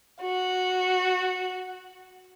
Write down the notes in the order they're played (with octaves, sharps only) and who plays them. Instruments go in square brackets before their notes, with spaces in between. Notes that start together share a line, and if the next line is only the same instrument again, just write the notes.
[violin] F#4